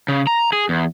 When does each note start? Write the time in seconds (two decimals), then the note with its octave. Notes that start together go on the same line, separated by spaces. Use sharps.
0.08 C#3
0.27 A#5
0.53 G#4
0.69 E2